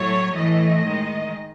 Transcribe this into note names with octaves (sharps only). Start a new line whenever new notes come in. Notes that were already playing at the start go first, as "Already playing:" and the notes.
Already playing: A2 F#3 A3 C#5
A2 E3 A3 D#5
D#3 G#3